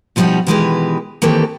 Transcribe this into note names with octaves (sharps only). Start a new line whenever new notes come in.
B2 F3 G3 C#4 D#4 F#4
B2 D#3 E3 G#3 G4 B4
D#3 E3 A#3 C4 G4 A4